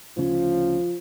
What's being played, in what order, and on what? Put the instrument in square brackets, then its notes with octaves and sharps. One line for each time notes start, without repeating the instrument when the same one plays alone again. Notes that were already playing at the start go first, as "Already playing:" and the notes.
[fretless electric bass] D2 C#3 C#4 [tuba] F3